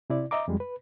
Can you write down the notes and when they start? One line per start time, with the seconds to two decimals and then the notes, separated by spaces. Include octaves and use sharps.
0.10 C3 E4 D5
0.31 D#5 E5 A#5 D6
0.48 F2 G3 G#3
0.60 B4